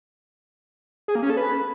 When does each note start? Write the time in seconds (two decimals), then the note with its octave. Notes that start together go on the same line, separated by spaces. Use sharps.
1.08 G#4
1.15 A#3
1.23 C#4
1.30 A4
1.37 B4